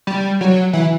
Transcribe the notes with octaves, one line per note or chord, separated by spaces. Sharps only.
G3
F#3
E3